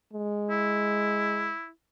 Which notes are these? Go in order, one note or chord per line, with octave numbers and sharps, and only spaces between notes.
G#3
E4